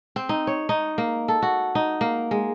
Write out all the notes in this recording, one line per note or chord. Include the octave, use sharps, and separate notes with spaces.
C4
D#4
C#5
D#4
A#3
A4
F#4
D#4
A#3
G#3